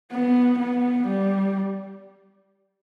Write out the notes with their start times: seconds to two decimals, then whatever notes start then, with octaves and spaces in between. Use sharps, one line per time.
0.12 B3
0.59 B3
1.08 G3